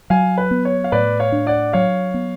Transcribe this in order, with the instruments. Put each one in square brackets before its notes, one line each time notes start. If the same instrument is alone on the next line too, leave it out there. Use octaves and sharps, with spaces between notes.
[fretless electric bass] F#3 [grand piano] F5 G#5
[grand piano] B4
[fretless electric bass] B3
[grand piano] C#5
F5
[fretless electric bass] A2 [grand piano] B4 D5
[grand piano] C#5 F5
[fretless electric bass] D4
[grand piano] D5 F#5
[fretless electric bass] F#3 [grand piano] C#5 F5
[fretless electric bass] B3